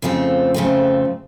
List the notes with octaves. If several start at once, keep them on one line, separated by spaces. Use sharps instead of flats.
F2 C#3 F3 A3 C4
F2 C#3 F3 A3 C4